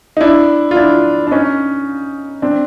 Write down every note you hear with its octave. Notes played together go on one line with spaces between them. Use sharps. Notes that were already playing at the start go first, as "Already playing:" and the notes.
D#4
D4 E4
F4
D4 E4
D4
C#4 D#4
C4 D4